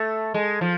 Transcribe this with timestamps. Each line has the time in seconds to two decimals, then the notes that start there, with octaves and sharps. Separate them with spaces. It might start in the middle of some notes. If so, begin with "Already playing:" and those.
Already playing: A3
0.34 G#3
0.61 F3